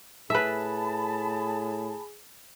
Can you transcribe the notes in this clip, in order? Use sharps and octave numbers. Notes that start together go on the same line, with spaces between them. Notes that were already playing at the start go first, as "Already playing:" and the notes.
A2 G#4 B4 E5 A5 B5